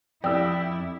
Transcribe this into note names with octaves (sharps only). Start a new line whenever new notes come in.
F2 E4 D5 G5 D#6 E6